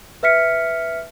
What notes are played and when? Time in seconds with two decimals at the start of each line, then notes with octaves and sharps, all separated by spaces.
0.23 B4 E5 F6 B6 C#7